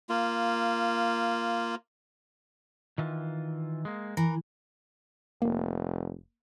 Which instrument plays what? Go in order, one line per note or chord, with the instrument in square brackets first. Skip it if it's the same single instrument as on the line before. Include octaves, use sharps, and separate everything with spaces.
[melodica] A#3 F4
[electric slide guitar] D#3 E3 F4
G#3 A#3
[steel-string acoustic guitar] E3 [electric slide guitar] A#4
[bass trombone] F1 [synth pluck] A#3